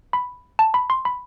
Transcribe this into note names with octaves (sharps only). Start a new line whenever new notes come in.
B5
A5
B5
C6
B5